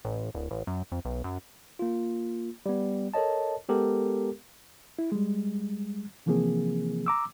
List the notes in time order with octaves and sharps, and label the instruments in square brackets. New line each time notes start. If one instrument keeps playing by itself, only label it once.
[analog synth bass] A1
D1
A1
F#2
F2
B1
F#2
[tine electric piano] A#3 F4
G3 B3
A4 A#4 C#5 D#5 A5
G#3 B3 G4 A4 A#4
[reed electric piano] E4
G3 G#3
C3 E3 F3 A#3 C4 G#4
A#5 D6 E6